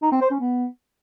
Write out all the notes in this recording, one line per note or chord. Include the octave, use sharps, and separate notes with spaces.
D#4
C4
C5
C#4
B3